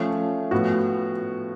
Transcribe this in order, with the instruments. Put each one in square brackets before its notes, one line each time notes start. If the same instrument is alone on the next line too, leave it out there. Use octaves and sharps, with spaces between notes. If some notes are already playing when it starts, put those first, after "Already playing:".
Already playing: [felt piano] F3 A3 C#4
A2 F3 B3 F#4